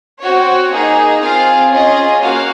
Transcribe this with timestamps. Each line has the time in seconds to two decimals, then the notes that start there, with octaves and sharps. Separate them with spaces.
0.21 C4 F#4 C#5
0.71 A#3 D#4 G#4
1.22 C4 F4 G#4 F5
1.72 C#4 F4 G#4 D#5
2.22 A#3 C#4 F#4 F5